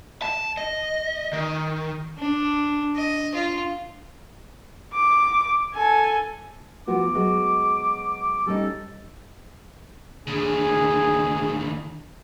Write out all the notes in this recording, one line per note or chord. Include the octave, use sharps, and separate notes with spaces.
A5
D#5
D#3
D4
D#5
F4
D6
A4 G#5
F3 B3 F#4 D6
F#3 G#3 B3
G3 C#4 D#4 A4
D#2 D3 G#4